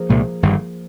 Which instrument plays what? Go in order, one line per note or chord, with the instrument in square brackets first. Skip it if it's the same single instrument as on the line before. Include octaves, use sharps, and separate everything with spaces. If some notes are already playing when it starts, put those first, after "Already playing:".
Already playing: [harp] F3 A#3 F4 G#4 A#4
[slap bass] C2 A#2 G#3
G1 G2 D#3 G3